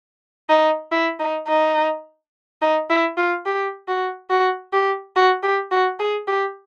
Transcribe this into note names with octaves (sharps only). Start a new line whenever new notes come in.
D#4
E4
D#4
D#4
D#4
E4
F4
G4
F#4
F#4
G4
F#4
G4
F#4
G#4
G4